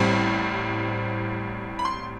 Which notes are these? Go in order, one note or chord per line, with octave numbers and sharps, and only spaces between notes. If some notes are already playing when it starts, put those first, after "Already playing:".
Already playing: A1 A2 G3 C4
B5
C6